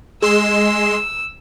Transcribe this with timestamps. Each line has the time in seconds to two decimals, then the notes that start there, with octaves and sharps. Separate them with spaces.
0.22 G#3 C6 E6